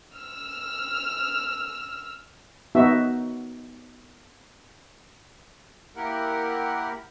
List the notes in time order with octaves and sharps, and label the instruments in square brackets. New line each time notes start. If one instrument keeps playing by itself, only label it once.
[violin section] E6 F6
[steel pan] B3 D#4 F#4 E5
[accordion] A#3 E4 G4 A#4 F#5